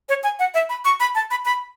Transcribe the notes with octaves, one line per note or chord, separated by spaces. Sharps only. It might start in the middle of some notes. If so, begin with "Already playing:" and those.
C#5
G#5
F#5
E5
B5
C#6
B5
A5
B5
B5